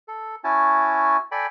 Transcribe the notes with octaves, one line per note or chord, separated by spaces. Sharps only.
A4
C#4 E4 F#4 G#5 A5
A4 D5 G5 G#5 B5